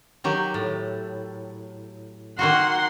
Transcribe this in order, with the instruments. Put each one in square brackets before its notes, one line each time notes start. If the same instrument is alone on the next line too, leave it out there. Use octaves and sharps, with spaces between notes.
[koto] D#3 F#3 G4
A2
[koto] D#3 A#3 F#4 [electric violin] F#5 C6